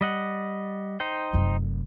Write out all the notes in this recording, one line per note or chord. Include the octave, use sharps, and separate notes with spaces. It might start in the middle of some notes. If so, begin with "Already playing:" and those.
G3 D#5 F#5
D#4 C5 G5
F1 F#2